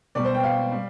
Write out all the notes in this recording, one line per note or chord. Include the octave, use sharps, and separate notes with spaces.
B2 G3 D5
C5
G5
F5
G3